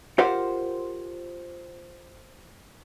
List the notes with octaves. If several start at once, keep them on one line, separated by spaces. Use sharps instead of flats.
F4 G4 A#4 C5 F5 F#5